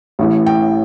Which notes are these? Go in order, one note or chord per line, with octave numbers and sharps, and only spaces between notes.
A1 A2 E3
G5